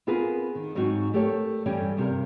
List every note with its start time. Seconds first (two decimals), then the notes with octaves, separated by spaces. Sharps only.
0.07 B3 C4 F4 G#4 A#4 B4
0.55 D#3
0.75 G#2 F#3 C4 D#4 F#4
1.14 A3 G4 A4 A#4 C#5
1.66 G2 E3 G3 C#4 G4
1.97 G2 C3 G3 A#4